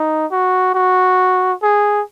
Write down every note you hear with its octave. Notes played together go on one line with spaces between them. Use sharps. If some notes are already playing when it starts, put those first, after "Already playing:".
Already playing: D#4
F#4
F#4
G#4